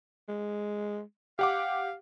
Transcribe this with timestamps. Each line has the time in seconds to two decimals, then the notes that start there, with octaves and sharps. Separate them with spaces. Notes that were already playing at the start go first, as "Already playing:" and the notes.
0.28 G#3
1.39 G4 F5 F#5 D6